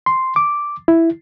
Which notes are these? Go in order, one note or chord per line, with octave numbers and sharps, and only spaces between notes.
C6
D6
E4